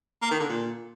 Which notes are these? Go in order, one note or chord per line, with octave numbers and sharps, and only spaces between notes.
A#3
D#3
D3
A#2